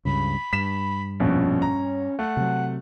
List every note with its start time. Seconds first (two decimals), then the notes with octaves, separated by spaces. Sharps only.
0.05 C#2 G2 C#3 B5
0.53 G2 B6 E7
1.20 A#1 F2 B2 C#4
1.62 A#5
2.19 A3 F#5
2.37 C3 F#3